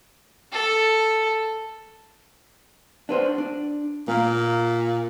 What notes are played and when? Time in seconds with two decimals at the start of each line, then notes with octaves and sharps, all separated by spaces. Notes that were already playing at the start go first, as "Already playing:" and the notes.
0.52 A4
3.09 D4 B4 C5
3.38 D4
4.08 A#2 A#3